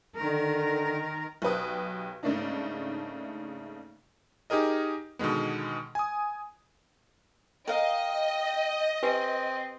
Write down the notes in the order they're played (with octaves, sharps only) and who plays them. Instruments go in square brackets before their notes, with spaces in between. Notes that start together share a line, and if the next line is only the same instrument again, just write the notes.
[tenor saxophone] D3 [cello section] D#3 A#4
[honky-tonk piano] B1 G4 B4 D#6
G#2 C#3 A3 A#3 D4 D#4
[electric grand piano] D#4 G4 G#4 A#4 D#5
B2 D3 D#3 G#3 B3
G#5 D#6
[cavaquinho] A#4 F5 [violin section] D#5 [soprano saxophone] G5
[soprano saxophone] C4 [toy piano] G4 B4 G#5